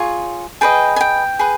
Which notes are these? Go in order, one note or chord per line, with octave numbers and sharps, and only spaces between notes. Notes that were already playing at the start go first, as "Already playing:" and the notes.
Already playing: F4 G#4 C#5
G#4 B4 D#5 G5
G#5
G5
G#4 B4